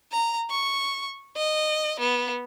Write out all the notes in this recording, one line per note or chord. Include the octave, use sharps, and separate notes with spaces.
A#5
C#6
D#5
B3